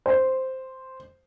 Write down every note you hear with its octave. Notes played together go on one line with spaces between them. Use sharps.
C5